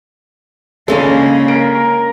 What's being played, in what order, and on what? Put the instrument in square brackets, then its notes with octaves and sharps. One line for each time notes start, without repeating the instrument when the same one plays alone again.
[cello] C#3 A#3 [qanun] G#3 C#4 D4 [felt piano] A4
[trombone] A#4 [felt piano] D7